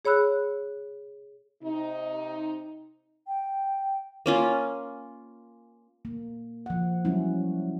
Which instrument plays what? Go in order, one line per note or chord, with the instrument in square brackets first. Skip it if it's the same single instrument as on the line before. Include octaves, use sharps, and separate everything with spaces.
[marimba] G#4 C#5 B5 E6 F#6
[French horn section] C3 D#4
[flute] G5
[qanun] A#3 C#4 F4
[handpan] A#3
F3 F#5
F#3 G3 C#4 E4